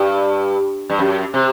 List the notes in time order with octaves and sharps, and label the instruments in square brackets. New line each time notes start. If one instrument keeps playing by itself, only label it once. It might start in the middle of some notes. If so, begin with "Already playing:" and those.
Already playing: [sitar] G2
G2
F#2
C3